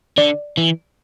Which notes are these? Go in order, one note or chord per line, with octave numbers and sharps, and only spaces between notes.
D3 D5
E3